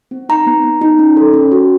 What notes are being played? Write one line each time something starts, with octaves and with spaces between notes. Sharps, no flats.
C4
D#4 A#5
B3
B3
D#4
C#4
A4
C#4
F#4